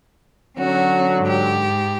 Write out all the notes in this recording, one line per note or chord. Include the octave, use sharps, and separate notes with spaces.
D3 F#3 C#4 F#4
G#2 G4